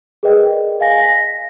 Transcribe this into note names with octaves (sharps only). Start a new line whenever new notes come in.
G#4 A#4 B4 D5 D#5 G5
D#5 F5 G#5 A#6
A#6 B6